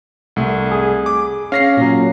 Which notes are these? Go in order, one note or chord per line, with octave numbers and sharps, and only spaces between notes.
C2 A3
G#4
D6
C#4 F5 A#6 C7
A#2 F#3